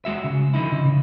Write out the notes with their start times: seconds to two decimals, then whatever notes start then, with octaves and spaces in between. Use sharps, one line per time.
0.05 G#3 F#4 E5
0.24 C#3
0.54 D3 F3 D#4 E4
0.72 C#3
0.86 C#3